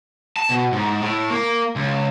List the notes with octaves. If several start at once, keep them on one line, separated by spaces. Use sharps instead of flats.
A5
B2
G#2
A2
A#3
C#2